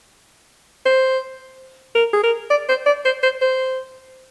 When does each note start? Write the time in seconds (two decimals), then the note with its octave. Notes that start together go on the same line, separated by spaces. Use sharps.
0.86 C5
1.95 A#4
2.13 G#4
2.23 A#4
2.50 D5
2.69 C5
2.86 D5
3.05 C5
3.23 C5
3.41 C5